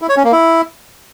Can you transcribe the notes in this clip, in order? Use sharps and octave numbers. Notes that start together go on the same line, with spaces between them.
E4
C#5
C#4
A#3
E4